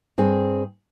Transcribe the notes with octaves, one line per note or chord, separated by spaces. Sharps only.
G2 C4 G#4